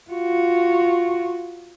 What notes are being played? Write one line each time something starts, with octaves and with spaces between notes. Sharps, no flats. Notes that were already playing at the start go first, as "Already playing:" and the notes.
F4 F#4